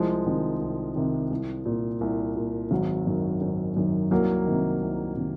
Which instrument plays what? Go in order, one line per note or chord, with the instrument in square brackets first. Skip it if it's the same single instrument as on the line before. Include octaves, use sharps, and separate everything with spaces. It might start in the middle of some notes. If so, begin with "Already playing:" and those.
Already playing: [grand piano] C2 F3 G#3
C3 D#3
C2
C3 D#3
C2
A#2
C2
A#2
G#1 F#3
F#2 D#3
G#1
F#2 D#3
C2 F#3 A#3
C3 D#3
C2
C3 D#3